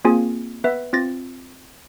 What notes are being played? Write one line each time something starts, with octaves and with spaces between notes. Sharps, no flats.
A#3 C4 F4 G#4 G#5
B3 B4 E5
C4 F4 A6 A#6